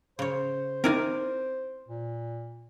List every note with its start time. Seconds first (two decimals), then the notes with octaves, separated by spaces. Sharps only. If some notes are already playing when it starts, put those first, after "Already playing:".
0.19 C#3 C5 C#5
0.84 C4 D#4 E4 A#4 D5 G#5
1.88 A#2